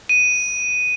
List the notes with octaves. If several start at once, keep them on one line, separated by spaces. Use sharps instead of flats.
D#7